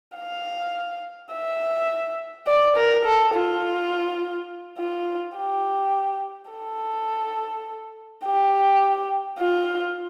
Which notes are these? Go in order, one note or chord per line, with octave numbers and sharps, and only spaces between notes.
F5
E5
D5
A#4
A4
F4
F4
G4
A4
G4
F4